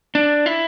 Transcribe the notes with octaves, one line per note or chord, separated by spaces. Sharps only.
D4
E4